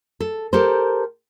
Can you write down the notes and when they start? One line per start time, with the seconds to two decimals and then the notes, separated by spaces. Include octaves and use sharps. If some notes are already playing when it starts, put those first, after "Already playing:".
0.20 A4
0.53 G4 A4 A#4 C5